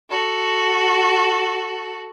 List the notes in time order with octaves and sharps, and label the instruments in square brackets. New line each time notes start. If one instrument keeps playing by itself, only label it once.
[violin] F#4 A4